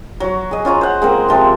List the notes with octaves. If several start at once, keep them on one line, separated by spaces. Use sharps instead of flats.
F#3 F#4
G#4 D#5
C#4 F4 C#5 A#5
C5 F#5
G#3 A#3 C4
C3 F3 C4